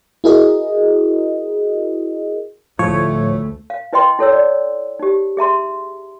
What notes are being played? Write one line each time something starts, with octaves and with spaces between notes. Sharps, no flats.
E4 F#4 G#4 A#4 D#5
D2 A2 F3 A3 C#5
F5
E4 B4 D#5 G5 C6
E4 A4 C#5 E6
D5
D#4 G4
G#4 E5 A#5 C6